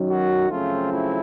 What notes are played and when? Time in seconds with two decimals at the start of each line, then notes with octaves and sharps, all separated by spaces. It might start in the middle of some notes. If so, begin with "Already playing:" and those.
Already playing: F#2 D#3 F#3
0.09 F#4
0.50 F#2 C#3 F3 A3 C4 F4
0.92 E4